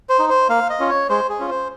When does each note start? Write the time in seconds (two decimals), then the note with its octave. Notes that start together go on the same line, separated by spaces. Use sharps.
0.09 C5
0.19 D#4
0.30 C5
0.49 A#3 F5
0.70 D#5
0.80 C#4 F4
0.89 C#5
1.09 G#3 C5
1.29 G#4
1.39 C#4 F4
1.50 C5